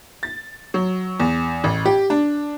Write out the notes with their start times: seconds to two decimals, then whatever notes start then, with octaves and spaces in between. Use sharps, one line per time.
0.23 A6
0.74 F#3
1.20 E2
1.64 A1
1.85 G4
2.10 D4